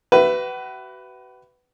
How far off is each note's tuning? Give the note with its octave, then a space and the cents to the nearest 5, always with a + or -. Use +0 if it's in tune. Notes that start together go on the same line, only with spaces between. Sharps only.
F#4 +40 B4 +10 E5 +25